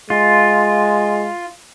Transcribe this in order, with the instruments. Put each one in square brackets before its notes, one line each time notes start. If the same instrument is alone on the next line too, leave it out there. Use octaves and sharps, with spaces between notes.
[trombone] G#3 [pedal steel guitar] F4